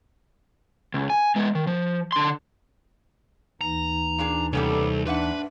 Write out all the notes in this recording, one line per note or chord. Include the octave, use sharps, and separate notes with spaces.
C#2
G#5
G#3 B3
D#3
F3
D3 C6
D#2 E3 D#4 A#5
A#2 D4 G#4
C2 G3 B3 C#4 A4
G#2 D4 B4 E5 F#5